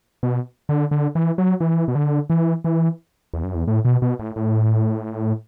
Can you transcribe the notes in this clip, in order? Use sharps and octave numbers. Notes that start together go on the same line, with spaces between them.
B2
D3
D3
E3
F#3
E3
B2
D3
E3
E3
E2
F#2
E2
A2
B2
B2
A2
A2